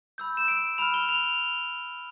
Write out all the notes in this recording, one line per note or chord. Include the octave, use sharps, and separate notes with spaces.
B5 E6 G6
E7
D7
B5 F6 F7
G7
F7